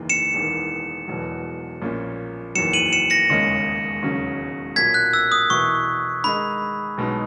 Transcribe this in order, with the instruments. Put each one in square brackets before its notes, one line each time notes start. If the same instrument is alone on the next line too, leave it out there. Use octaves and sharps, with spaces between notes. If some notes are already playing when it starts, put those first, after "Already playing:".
Already playing: [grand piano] F#1 E2 D#3 A#3
[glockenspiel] C#7 E7
[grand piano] E1 E2 D#3
E1 E2 B2 F#3
A#1 A#2 A#3 C#4
[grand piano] F#1 E2 D#3 F#3 [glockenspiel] C#7 E7
[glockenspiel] D#7 F#7
C#7 E7
A#6 C#7
[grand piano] E1 D#2 C#3 G#3 C#4
E1 D#2 C#3 F#3 C#4
[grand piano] B1 A#2 F#3 [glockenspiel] G#6 B6
[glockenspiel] F#6
E6
D#6
[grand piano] E2 B2 A#3 E4 B4 [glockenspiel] C#6
[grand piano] D#3 G#3 D#4 G#4 D#5 [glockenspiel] B5
[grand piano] B1 B2 G#3 D#4